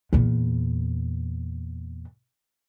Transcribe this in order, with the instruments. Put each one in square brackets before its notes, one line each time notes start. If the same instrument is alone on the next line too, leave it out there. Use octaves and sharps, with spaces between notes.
[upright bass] E2 A#2